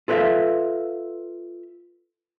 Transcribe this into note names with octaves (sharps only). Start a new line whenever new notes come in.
F4 A4 B4 C#5 E5 F5